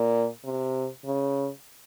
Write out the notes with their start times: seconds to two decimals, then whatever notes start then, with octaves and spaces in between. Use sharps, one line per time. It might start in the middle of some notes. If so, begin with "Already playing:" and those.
Already playing: A#2
0.45 C3
1.06 C#3